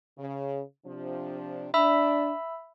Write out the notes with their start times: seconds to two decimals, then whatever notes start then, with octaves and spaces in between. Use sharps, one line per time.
0.18 C#3
0.86 C3 F3 D4
1.74 D4 E5 B5 E6